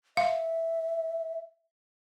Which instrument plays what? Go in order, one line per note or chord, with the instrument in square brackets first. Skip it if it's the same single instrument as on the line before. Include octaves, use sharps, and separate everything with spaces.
[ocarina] E5 [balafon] F5